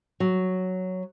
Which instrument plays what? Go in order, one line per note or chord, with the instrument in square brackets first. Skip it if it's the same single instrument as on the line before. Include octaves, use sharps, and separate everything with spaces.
[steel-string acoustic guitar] F#3